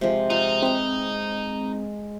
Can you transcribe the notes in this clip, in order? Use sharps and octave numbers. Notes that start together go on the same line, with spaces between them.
C3 F3 G#3
D#4 F4
C4 B4 E5